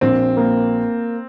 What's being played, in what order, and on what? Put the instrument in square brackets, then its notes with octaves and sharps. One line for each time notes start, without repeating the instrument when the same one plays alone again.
[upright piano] A#1 [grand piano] C4
[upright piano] A#3